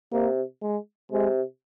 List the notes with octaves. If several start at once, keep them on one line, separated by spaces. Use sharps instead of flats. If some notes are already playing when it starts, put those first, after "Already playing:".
C3 A#3
G#3
C3 G#3